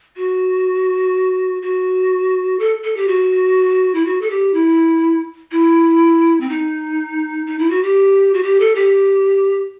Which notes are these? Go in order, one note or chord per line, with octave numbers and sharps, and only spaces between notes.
F#4
F#4
A4
A4
G4
F#4
E4
F#4
A4
G4
E4
E4
C4
D#4
D#4
E4
F#4
G4
F#4
G4
A4
G4